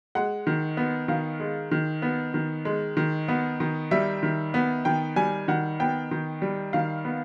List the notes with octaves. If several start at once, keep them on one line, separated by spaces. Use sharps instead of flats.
G#3 F#5
D#3
B3
D#3 F5
G#3
D#3
B3
D#3
G#3
D#3
B3
D#3
G3 E5
D#3
B3
D#3 G5
G3 G#5
D#3 F#5
B3 G5
D#3
G3
D#3 F5
B3